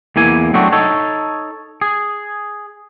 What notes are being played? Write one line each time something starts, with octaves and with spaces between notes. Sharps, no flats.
E2 A#3 E4 G#5
F#3 A3 C4 D4 F#4
D#4 A4 C#5
G#4